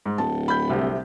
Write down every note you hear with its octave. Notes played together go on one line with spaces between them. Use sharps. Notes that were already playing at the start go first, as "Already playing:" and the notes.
G#2
D1 A5
B5 G6
C2 C3